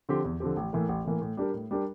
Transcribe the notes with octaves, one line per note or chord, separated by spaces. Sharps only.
D3 F3 C4 G4
E2
D3 F3 C4 G4
A1
A2 E3 A#3
A1
A2 E3 A#3
A2
G3 D4 G4 A#4
A2
G3 D4 G4 A#4